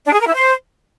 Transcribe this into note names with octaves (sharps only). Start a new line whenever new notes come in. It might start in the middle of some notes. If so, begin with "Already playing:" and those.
D4
G#4
A#4
E4
C5